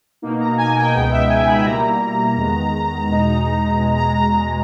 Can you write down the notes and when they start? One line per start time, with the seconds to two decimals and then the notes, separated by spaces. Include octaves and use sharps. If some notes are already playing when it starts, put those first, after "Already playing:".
0.22 B2 A#3 D#4
0.40 A#5
0.57 G#5
0.76 G5
0.93 C#2 B2 G#3 B3 D#4 G5
1.12 E5
1.29 G#5
1.47 B5
1.64 B2 G3 A#3 E4 A#5
2.36 E2 D#3 G#3 B3
3.08 E2 B2 G#3 D#4
3.79 E2 B2 G#3
3.97 A#5
4.15 A#5
4.33 A#5